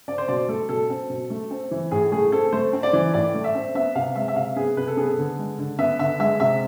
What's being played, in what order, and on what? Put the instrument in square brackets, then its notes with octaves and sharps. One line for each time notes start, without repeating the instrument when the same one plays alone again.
[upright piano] C4 D5
C5
B2 D5
A3 A4
B2 A4
C4
B2
A3
C4
E3
A2 G#4
A3 G#4
C4 A4
A3 C5
C4
D5
E3
A2 D5
A3
E5
C4
B3 E5
C3 F5
G#3 E5
E5
C3 F5
B3 G#4
C3 B4
A4
B3 G#4
A4
D3
G#3
D3
B3 E5
D3 E5
G#3 E5
C3 E5